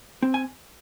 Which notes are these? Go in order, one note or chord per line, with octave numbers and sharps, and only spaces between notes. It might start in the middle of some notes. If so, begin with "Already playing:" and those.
C4
G#5